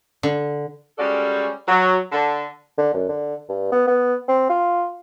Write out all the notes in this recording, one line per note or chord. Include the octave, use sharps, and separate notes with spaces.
D3
G3 G#3 C#4 F#4 A4 D5
F#3
D3 A4
D3
F#2
D3
G2
B3
B3
C4
F4